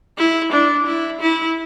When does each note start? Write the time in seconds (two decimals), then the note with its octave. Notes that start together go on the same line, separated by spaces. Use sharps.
0.18 E4
0.52 D4
0.86 E4
1.21 E4